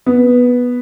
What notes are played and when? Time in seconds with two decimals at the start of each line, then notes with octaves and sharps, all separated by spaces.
0.06 B3